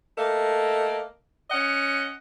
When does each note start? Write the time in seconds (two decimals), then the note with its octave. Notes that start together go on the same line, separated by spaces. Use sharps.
0.16 A3 A#3 D#5
1.50 C#4 D#5 F#5